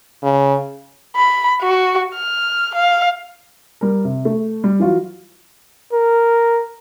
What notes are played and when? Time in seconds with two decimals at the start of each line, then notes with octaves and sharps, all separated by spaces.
0.23 C#3
1.16 B5
1.61 F#4
2.15 F6
2.75 F5
3.81 G3 A#4
4.05 C3
4.25 A3
4.64 G3
4.79 E3 F#3 F4 F#4
5.92 A#4